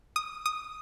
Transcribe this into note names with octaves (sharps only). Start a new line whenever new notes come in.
D#6
D#6